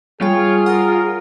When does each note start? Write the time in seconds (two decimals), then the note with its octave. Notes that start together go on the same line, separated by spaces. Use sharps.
0.21 G3 F4 G#4 C#5 G5
0.66 A#4 F#5 D#6 F6